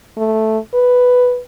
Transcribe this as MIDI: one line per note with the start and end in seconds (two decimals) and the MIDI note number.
0.17 0.58 57
0.74 1.40 71